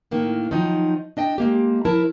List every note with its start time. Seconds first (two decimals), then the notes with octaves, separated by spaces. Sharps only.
0.11 A2 D#3 A#3
0.51 D#3 F3 F#3 D#4
1.17 D4 D#5 G5
1.38 G#3 A#3 G4
1.85 F3 E4 A#4 A5